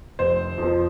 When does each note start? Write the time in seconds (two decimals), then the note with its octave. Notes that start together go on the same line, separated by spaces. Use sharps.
0.19 F1 C5
0.58 F2 F3